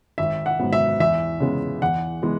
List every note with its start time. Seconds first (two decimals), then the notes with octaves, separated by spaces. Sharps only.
0.18 G#1 E5
0.46 F#5
0.60 G#2 F#3 B3
0.73 E5
1.00 E2 E5
1.40 C#3 G#3 B3
1.82 E2 F#5
2.22 E3 G#3 B3